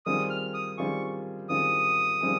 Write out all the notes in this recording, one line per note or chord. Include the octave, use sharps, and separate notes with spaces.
D#3 G3 C4 F4 G#4 D#6
F6
D#6
D#3 G3 C4 F4 G#4 C#6
D#3 G3 C4 F4 G#4 D#6
D#3 G3 C4 F4 G#4